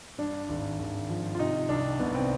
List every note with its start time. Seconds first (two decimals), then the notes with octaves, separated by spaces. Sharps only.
0.18 G2 D4
0.49 G#1
0.79 G#1
1.10 F3
1.35 F4
1.39 C3 D#4
1.69 C2 D4
2.00 C2 B3
2.15 C4